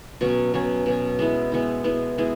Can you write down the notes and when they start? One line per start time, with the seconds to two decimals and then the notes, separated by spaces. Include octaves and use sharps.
0.21 B2 F#3 C#4
0.54 B2 F#3 C#4
0.86 B2 F#3 C#4
1.19 G#3 B3 E4
1.52 G#3 B3 E4
1.84 G#3 B3 E4
2.18 G#3 B3 E4